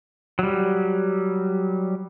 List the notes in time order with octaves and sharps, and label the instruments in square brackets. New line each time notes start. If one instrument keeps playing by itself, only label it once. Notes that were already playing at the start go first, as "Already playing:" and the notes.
[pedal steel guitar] F#3 G3